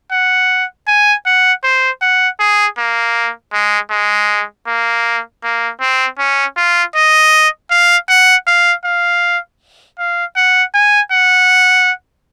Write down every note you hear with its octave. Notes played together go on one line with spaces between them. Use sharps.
F#5
G#5
F#5
C5
F#5
G#4
A#3
G#3
G#3
A#3
A#3
C4
C#4
F4
D#5
F5
F#5
F5
F5
F5
F#5
G#5
F#5